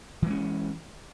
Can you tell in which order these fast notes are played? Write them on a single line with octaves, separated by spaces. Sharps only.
E3 G#3 C#4